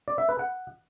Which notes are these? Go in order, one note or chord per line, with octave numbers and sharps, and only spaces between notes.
D5
E5
B4
F#5